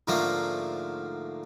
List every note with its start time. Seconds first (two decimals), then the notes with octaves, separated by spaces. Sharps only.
0.07 G#2 D3 F3 A3 A#3